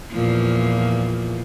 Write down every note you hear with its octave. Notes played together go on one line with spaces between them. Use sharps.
E2 A#2 F3